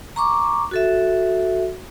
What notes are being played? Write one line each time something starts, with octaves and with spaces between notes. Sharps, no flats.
A#5 C#6 D6
F#4 A4 E5